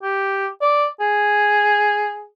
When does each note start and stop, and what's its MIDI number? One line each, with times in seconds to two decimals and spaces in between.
0.03 0.47 67
0.62 0.86 74
1.01 2.26 68